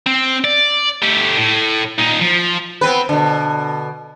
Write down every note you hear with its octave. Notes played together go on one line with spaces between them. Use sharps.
C4
D5
A3 G4
A2
A#2 D#4
F3
B3 C4 B4
B2 D3